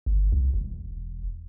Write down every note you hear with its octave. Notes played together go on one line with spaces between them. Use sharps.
G1
C2
E1